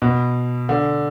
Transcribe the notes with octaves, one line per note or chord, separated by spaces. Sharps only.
B2
D3